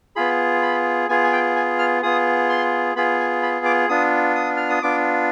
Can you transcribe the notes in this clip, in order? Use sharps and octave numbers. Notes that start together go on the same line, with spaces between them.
B3 F4 G#4 B5
B5
B3 F4 G#4 G#5
G#5
G5
G#5
F6
B3 F4 G#4 D#6
C6
B3 F4 G#4 B5
G#5
B5
D6
B3 D4 F4 D#6
D#6
F6
D#6
B3 D4 F4 D6